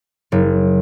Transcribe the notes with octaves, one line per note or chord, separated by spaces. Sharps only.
F#1